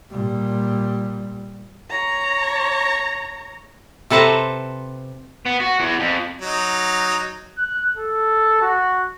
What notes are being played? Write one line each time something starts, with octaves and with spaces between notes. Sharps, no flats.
A#2 G3
C#5 A#5
C3 A4 B4 C5 A5 A#5
B3
F#4
E2
F2
F#3 D#4
F#6
A4
F#4